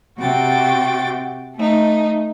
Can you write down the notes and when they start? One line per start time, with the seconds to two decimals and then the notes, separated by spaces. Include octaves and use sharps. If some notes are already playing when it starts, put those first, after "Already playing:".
0.18 C3 F#4 G5 A6
1.56 A3 D#4